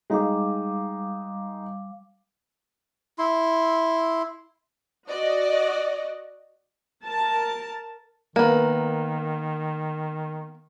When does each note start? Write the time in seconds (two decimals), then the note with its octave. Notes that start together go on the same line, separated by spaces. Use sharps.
0.10 G3 G#3 D#4 F5 D6
3.19 E4 C6
5.08 F#4 D5 D#5
7.05 A#4 A5
8.36 D#3 A#3 B3